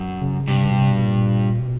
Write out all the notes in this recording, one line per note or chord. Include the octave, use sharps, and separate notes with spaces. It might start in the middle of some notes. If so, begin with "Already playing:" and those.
Already playing: F#2
C#3
G2 C3
C#3
B2
C3
B2
A#2
B2